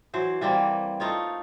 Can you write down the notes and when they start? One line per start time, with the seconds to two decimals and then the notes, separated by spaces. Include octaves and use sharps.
0.14 E3 F#3 C5
0.41 E3 G3 A#3 C4
1.00 A3 D#4 F4 C#5